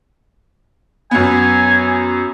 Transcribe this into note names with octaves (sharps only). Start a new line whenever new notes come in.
F#2 B3 G#5